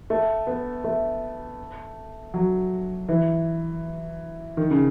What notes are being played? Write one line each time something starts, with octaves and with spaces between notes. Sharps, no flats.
A3
B3
A3
F#3
E3
D#3
C#3